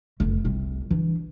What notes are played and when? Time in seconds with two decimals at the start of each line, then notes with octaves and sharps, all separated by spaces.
0.20 F1 A3
0.44 C2 C3
0.91 E3 D4